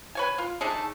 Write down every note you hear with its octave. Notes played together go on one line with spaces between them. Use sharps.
B4 C#5 G#5
F4
A3 D4 D#4 G#4